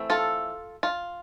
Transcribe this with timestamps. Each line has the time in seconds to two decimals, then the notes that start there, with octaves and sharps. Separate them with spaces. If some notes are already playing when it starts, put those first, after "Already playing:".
Already playing: E3 A3 C4
0.10 F4 A4
0.83 F4